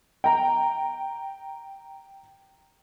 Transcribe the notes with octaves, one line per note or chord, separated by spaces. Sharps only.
G5 A#5